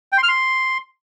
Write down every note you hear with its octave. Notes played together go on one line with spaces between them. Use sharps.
G5
C6
F6
C6